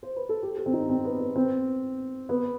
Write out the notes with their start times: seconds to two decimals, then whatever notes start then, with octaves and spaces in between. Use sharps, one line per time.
0.03 C5
0.16 B4
0.29 A4
0.43 G4
0.57 A4
0.66 C4
0.73 D#4
0.90 C4
1.05 B3
1.20 B3
1.36 C4
2.29 B3